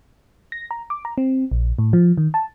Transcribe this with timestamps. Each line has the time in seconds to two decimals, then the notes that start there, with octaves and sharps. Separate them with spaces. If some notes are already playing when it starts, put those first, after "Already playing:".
0.52 A#6
0.71 A#5
0.90 D6
1.05 A#5
1.18 C4
1.51 A#1
1.79 A2
1.93 F3
2.18 D#3
2.34 A5